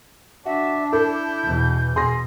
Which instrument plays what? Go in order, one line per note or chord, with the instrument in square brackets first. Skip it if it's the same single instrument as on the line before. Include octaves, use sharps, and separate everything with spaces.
[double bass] D4 [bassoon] F#4 [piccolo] E5
[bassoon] E4 [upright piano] A4 [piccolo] G6
[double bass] E2 B2
[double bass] B2 [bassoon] G#4 [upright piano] C6 A#6